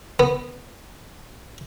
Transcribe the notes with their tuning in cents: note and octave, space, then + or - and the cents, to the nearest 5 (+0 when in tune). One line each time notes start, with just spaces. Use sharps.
B3 +0